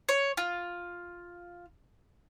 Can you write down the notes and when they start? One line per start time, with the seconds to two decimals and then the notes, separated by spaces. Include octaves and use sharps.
0.09 C#5
0.37 F4